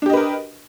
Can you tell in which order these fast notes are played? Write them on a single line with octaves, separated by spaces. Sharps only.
D4 G4 D#5 B4 A#4